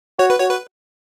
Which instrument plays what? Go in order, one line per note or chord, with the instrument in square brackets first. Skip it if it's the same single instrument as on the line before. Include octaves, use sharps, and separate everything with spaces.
[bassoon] F#4 [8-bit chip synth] C#5
[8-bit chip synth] B4
[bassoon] F#4 [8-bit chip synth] C#5
[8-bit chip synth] B4